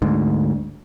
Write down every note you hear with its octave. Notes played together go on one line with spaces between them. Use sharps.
D2 G#2